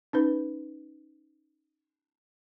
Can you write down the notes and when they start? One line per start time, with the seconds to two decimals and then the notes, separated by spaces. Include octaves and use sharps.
0.13 C#4 D#4 B4